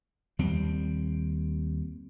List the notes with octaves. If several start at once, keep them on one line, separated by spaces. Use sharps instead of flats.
D#2 G3 C4